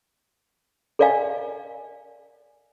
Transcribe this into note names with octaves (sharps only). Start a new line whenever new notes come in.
A4 A#4 D5 D#5 F5 G#5